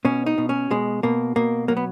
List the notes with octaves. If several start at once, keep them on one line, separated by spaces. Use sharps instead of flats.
B2 C#4
D#4
B2
C#4
B2 G#3
B2 A#3
B2 A#3
F#3 A#3
B3